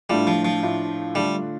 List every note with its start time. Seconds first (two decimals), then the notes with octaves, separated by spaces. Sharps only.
0.10 A2 G3 A3 D4 F4
0.27 F3
0.45 F3
0.63 A2 A3 D4 F4
1.15 D3 G3 A3 D4 F4